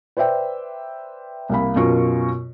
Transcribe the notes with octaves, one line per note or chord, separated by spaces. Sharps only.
B4 C5 D5 E5 G5
C2 A#3 B5
F#2 B2 F4 A#4 C#6